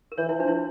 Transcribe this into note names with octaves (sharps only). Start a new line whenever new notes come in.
A#4
E3 C#5
E3 E4
F3 D4
E4